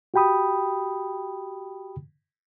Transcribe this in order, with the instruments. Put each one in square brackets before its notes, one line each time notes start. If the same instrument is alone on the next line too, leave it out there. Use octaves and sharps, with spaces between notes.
[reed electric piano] F#4 G4 G5 B5 D#6